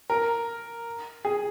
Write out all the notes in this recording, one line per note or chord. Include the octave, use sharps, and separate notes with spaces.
A#4
G#4